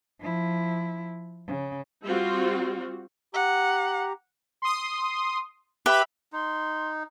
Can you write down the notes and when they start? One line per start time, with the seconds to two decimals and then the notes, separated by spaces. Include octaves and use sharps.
0.20 F3 E4
1.47 C#3
2.06 G3 C4 F4 F#4
3.34 G4 F#5 A#5
4.62 C6 D#6
5.86 G4 B4 E5 B5
6.33 D#4 C6